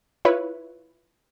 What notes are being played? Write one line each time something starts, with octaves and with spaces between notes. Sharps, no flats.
E4 F4 B4 C#5